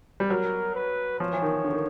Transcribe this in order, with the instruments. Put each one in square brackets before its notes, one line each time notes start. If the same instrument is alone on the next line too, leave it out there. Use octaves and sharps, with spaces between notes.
[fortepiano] G3
[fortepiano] F#3 [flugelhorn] A#4
[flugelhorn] B4
[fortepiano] F3 [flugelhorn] C#5
[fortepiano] E3
D#3
D3
D#3